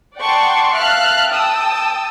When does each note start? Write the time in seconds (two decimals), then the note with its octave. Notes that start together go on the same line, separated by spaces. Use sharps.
0.17 D5 F#5 G5 A5 C6 C#6
0.74 E5 F5 A5 F6 F#6
1.30 G5 A5 D#6 E6